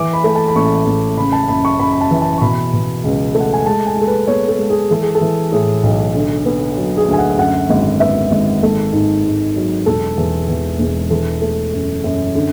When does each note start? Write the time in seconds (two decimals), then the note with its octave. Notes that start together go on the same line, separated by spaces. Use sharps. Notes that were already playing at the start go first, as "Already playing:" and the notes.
Already playing: E3 D6
0.13 B5
0.24 A3
0.35 A5
0.48 B5
0.55 A1 C#6
0.86 A1
1.17 C#3 B5
1.32 A5
1.48 F#2 B5
1.65 C#6
1.80 F#2 B5
1.92 B5
2.01 A5
2.11 E3
2.22 A5
2.38 C#6
2.41 B2 B5
2.73 B2
3.04 C#2
3.35 A3
3.40 F#5
3.53 G#5
3.66 G#3 A5
3.86 G#5
3.97 G#3 A4
4.07 B4
4.27 B3 C#5
4.49 A4
4.58 G#3
4.70 G#4
4.91 E3 A4
5.02 G#4
5.15 A4
5.21 E3
5.52 A2 G#4
5.83 B1
6.14 D3
6.46 B3
6.77 F#3
6.97 G#4
7.08 D2
7.13 G#5
7.18 F#5
7.38 F#2 F#5
7.70 G#1
8.00 B3 E5
8.31 G#1
8.62 G#1 A4
8.93 G#2
9.24 G#2
9.56 F#3
9.86 E1 A4
10.18 E2
10.48 E2
10.79 E1
11.10 E3 A4
11.42 A3
11.73 F#2
12.04 F#2
12.35 D3